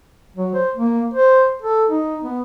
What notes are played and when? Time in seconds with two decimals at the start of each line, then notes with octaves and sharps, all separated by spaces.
0.36 F#3
0.54 C5
0.75 A#3
1.14 C5
1.62 A4
1.89 D#4
2.23 B3